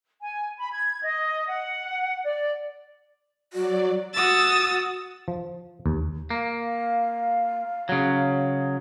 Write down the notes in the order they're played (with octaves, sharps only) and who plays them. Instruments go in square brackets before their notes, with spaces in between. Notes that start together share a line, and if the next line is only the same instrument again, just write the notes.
[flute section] G#5
B5
G#6
D#5
F#5
D5
[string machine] F#3 D5 [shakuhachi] F#4
[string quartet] F#4 D#6 E6 A6
[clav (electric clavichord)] F3
D#2
[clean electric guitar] A#3 [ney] F5
[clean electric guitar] C#3 F#3